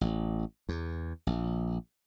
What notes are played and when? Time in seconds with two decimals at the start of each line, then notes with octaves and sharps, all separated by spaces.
0.01 A1
0.69 E2
1.27 A#1